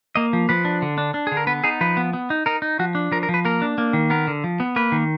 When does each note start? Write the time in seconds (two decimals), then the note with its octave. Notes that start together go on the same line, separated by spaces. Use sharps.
0.16 A#3 D#5
0.33 F3
0.49 F3 B4
0.65 D4
0.82 D3
0.98 D4
1.14 D4
1.27 D3 G#4
1.37 A#4
1.47 B3 B4
1.64 D#4 G#4
1.81 F3 B4
1.97 B3
2.13 B3
2.30 D#4
2.46 D#4 A#4
2.62 D#4
2.79 F3 F#4
2.95 D4
3.12 F3 A#4
3.23 A#4
3.29 F3
3.34 B4
3.45 A#3 A#4
3.62 D4
3.78 A#3
3.93 D#3
4.10 B3 A#4
4.27 D3
4.44 F3
4.60 B3
4.76 A#3 B4
4.92 D#3